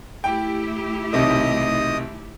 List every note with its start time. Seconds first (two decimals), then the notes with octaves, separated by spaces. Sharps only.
0.24 A3 E4 G4 G5
1.13 B1 C3 D#3 D#5 D#6